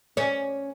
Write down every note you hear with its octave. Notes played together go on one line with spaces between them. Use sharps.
C#4